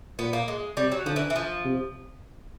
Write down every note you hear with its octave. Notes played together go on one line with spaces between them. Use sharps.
A#2 B3
A#3
G#3
C3 G3
F#3
D3 F3
E3
E3
F3
C3